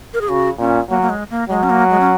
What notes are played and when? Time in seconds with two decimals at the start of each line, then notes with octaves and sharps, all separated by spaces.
0.14 A#4
0.21 G#4
0.28 C#3 F#4
0.58 A#2 C#4
0.89 F#3 A#3
1.02 A#3
1.09 G#3
1.30 A#3
1.49 F#3 G#3
1.63 C#4
1.70 A#3
1.90 G#3
2.00 C#4